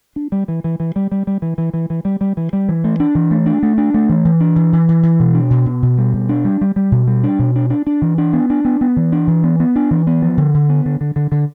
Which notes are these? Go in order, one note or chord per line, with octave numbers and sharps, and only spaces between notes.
D4
G3
E3
E3
E3
G3
G3
G3
E3
E3
E3
E3
G3
G3
E3
G3
E3
A3
D4
E3
A3
D4
A3
D4
A3
E3
E3
D4
E3
E3
E3
E3
B2
D4
B2
B2
B2
G3
B2
D4
G3
G3
G3
B2
G3
D4
B2
D4
D4
D4
E3
D4
B3
D4
B3
B3
E3
D4
E3
B3
B3
D4
E3
B3
F3
D3
D3
B3
D3
D3
D3
D3